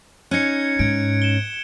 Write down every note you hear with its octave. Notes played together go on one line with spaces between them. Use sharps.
C#4 D#4 F#6 G#6 C#7
G#2 G#6 D7
E7 G7